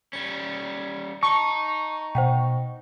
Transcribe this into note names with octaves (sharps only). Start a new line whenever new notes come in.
G3 C#4 C#7
D#4 A5 C#6
B2 C5 F#5 G5